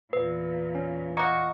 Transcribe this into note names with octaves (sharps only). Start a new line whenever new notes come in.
E2 A#2 B4
C#4
A#3 F#4 D#5 C#6